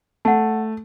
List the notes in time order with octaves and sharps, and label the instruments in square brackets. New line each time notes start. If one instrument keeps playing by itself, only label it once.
[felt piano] A3 [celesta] F#5 A5